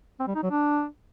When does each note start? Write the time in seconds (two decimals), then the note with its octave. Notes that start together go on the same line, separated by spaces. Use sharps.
0.20 C4
0.27 G3
0.35 D#4
0.43 F#3
0.51 D4